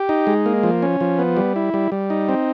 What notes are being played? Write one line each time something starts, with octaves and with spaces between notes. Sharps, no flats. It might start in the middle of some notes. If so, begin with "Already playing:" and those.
Already playing: G4
D#4
G#3
A#3
F3
C#4
F3
B3
G3
E4
G3
G3
D#4
C4